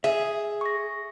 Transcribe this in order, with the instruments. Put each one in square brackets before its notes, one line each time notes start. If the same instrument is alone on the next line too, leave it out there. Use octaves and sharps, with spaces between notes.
[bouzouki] G#4 [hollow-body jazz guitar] E5
[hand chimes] C#6 A#6